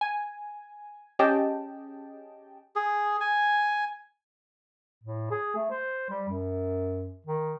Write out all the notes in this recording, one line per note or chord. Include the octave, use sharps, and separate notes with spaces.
G#5
C#4 G4 G#4 D#5 G5 A5
G#4
G#5
A2
G#4
A3
C5
G3
F#2
D#3